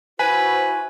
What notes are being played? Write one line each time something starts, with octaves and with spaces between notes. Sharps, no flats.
E4 F#4 B4 C5 G#5